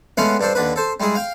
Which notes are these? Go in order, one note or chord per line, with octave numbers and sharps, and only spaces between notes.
G#3 A3 B3 C#4 F5 F#5
G2 D4 A4 C5
D#2 D3 D4 B4
A4 C5
G3 G#3 E4 G#4
F5 G5